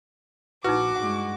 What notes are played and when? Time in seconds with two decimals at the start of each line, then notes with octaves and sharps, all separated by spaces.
0.64 A#1 D#4 E4 F#4 B4 D6
0.96 G2 G#3 F#5